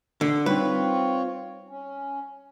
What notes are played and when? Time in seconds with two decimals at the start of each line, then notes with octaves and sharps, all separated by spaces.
0.21 D3
0.46 G3 C4 D#4 F4 B4 C#5
1.69 C#4